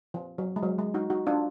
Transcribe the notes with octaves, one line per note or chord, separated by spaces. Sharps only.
F3
F#3
G#3
F#3
G#3
D#4 F#4
D#4 F#4
D4 F4